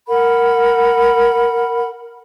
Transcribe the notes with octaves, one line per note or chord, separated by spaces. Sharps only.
A#4 F#5 B5